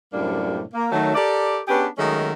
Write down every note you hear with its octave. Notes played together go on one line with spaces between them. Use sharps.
F#2 A2 C3 G3 A#3 D4
A#3
D#3 F#3 A3
G4 A4 A#4 D5
B3 C#4 D4 G4 G#4 B4
D#3 F#3 G#3 A3 C#4 D#4